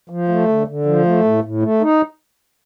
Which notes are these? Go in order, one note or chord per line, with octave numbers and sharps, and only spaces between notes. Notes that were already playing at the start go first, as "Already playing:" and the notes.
F3
A3
D3
D3
F3
A3
A2
A2
A3
D#4